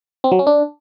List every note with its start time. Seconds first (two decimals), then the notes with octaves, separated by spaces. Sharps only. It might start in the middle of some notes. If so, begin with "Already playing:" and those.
0.24 C4
0.32 F#3
0.39 C#4
0.47 D4